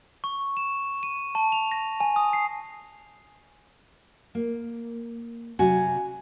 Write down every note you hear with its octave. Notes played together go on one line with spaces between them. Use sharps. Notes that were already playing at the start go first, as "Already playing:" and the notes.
C#6
E7
D#7
A5
F7
A#6
G#5
D#6
C7
A#3
C3 F#3 F#4 G#5